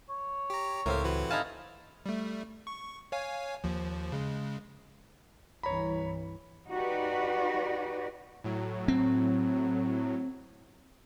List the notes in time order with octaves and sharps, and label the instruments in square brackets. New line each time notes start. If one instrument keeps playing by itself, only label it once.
[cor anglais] C#5
[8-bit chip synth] G4 A#5
[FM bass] C#2 [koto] A2 C4 G4 [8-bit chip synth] A#4 F5
[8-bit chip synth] E3 F#4 B4
[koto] D#4 E4 A5 [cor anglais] F5 [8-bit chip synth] G#5
[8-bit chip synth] G3 A3
C#6
C#5 F5 G#5
D#2 F3
C#3 G#3
[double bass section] C2 G2 E3 [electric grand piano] C#5 A#5 B5
[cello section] D#4 F#4 G4 B4 D5
[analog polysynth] A2 F#3
[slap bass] C4